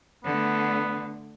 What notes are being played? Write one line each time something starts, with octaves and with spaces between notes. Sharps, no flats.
D3 A3 B3